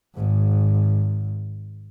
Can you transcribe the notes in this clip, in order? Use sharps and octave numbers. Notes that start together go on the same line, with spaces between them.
G#1 G#2